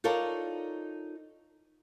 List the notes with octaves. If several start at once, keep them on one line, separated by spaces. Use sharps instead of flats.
D#4 F4 A4 A#4 C#5 D5